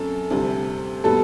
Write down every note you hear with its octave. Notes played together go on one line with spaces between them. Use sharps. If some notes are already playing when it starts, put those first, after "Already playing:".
Already playing: F#2 F#3 C4 A4
D2 C3 G3
B2 G3 B3 A4